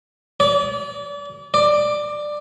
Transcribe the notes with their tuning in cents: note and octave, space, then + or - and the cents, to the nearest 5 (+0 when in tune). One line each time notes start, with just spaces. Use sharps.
D5 -35
D5 +15